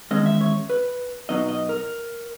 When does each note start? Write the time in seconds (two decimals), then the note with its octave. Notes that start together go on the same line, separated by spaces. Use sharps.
0.11 E2 D#3 G#3 C#4 D#5
0.26 E5
0.41 C#5
0.70 B4
1.29 B2 F#3 B3 D#4 D#5
1.49 D#5
1.69 A#4